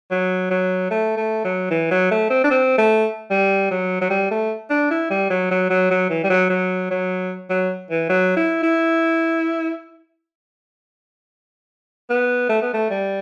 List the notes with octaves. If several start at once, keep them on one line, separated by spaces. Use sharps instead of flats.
F#3
F#3
A3
A3
F#3
E3
F#3
A3
C4
D4
C4
A3
G3
F#3
F#3
G3
A3
D4
E4
G3
F#3
F#3
F#3
F#3
E3
G3
F#3
F#3
F#3
F#3
E3
F#3
E4
E4
B3
A3
B3
A3
G3